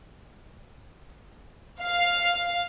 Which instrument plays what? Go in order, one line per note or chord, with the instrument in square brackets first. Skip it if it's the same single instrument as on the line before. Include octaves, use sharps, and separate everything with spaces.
[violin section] F5